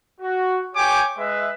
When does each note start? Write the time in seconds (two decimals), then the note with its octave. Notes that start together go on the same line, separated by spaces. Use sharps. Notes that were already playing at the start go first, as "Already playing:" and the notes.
0.21 F#4
0.75 G4 C#5 G5 G#5 D6
1.18 G#3 B4 D#5 E5